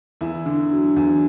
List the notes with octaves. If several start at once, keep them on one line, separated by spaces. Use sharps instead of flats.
E2 E4
D3
F#3
E2